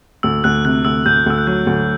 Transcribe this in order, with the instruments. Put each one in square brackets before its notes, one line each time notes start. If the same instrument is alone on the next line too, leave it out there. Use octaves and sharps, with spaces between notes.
[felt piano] D2 [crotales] E6
[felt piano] D2 [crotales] F#6
[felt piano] C3 [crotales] F#6
[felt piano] D2 [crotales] E6
[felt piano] D2 [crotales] G6
[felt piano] D2 [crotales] E6
[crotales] F#6
[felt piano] F#3 [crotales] G6
[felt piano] D2